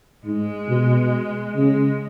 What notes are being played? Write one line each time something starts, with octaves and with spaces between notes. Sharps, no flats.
G#2 G#3
B2
C#3 G#3